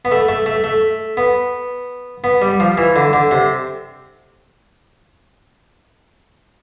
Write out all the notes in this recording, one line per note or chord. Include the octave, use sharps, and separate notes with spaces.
B3
A3
A3
A3
A3
B3
B3
G3
F3
E3
D3
D3
C3